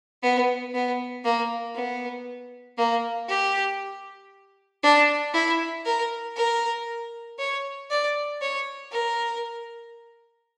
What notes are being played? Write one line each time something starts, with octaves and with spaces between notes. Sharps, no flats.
B3
B3
A#3
B3
A#3
G4
D4
E4
A#4
A#4
C#5
D5
C#5
A#4